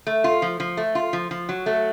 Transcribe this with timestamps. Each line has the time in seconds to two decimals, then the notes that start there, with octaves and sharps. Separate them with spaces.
0.07 A3
0.24 F4
0.42 F3
0.60 F3
0.77 A3
0.95 F4
1.13 F3
1.31 F3
1.49 F#3
1.66 A3